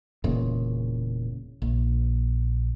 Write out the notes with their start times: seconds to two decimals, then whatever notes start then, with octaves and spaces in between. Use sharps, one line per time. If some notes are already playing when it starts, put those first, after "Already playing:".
0.24 E1 A#2 C#3
1.62 A#1